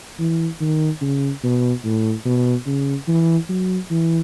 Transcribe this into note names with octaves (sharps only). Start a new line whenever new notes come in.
E3
D#3
C#3
B2
A2
B2
C#3
E3
F#3
E3